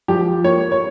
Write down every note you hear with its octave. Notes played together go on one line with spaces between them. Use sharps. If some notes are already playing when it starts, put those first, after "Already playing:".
F3 G4
A#3 C#5
C#5